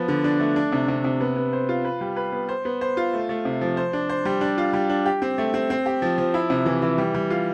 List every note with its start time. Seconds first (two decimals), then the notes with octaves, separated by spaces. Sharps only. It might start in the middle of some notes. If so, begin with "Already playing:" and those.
Already playing: F3 B3
0.08 D3
0.24 D4
0.40 A3
0.56 D4
0.72 C3
0.88 C3
1.04 C3
1.20 B3
1.36 B3
1.53 C5
1.69 F4
1.84 B4
2.01 G3
2.16 B4
2.32 B3
2.49 C5
2.65 B3
2.81 C5
2.97 F4
3.13 A3
3.29 A3
3.45 C3
3.61 F3
3.77 C5
3.93 D4
4.09 C5
4.25 G3
4.41 D4
4.58 F4
4.73 G3
4.89 D4
5.06 G4
5.22 C4
5.38 A3
5.54 C4
5.70 C4
5.86 G4
6.02 F3
6.18 F3
6.34 E4
6.50 C3
6.66 E3
6.82 E3
6.98 G3
7.14 G3
7.30 F4